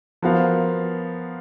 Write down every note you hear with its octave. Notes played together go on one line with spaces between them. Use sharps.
F3 B3 F#4 A#4 F5